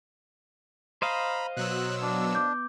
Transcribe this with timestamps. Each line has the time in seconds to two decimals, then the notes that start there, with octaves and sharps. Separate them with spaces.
1.02 C5 D#5 F5 A#5 B5
1.57 B2 F#3 E6 F#6
2.02 D4
2.35 B3 D6 G6